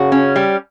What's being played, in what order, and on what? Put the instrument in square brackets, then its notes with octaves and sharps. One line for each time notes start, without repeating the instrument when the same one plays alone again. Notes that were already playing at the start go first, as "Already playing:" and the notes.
Already playing: [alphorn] C#3 [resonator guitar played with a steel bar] F#4
[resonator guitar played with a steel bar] C#4
G3